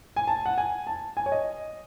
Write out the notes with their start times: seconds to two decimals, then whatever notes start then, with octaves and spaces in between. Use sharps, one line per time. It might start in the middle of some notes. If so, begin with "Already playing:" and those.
0.16 G#5
0.27 A5
0.46 F#5
0.58 G#5
0.87 A5
1.17 G#5
1.26 C#5
1.32 D#5